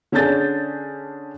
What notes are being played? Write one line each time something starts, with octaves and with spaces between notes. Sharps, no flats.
D3 C#4 D4 G#4 G6 A6